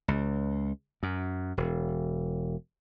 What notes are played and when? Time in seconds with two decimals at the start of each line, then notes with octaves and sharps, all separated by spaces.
0.08 C#2
1.03 F#2
1.57 E1